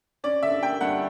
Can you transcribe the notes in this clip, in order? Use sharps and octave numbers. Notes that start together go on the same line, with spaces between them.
C#4 D5
D3 E5
A#3 G5
G2 F#5